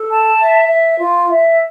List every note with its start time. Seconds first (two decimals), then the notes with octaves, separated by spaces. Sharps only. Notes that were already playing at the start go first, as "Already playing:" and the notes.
Already playing: A4
0.11 A5
0.40 E5
0.69 E5
0.99 F4
1.29 E5